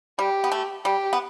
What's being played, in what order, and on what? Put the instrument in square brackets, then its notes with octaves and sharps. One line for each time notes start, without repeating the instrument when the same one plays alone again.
[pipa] G3 [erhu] G4
[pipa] B3
A3
[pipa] G3 [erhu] G4
[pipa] B3